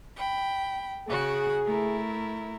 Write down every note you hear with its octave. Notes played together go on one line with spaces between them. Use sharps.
G5 B5
C#3 F#4 G#4 F#6
A3 E4 A#4